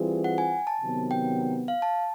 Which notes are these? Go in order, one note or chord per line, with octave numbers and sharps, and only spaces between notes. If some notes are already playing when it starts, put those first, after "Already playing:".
Already playing: E3 G3 C4 F4 G#4
F#5
G#5
A5
C3 D#3 F#3 B3
G5
F5
A5